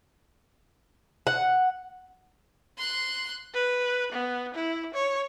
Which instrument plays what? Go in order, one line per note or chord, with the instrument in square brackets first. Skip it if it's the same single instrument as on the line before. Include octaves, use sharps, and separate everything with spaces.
[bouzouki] F#5
[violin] C6 F#6
[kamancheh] B4
B3
E4
C#5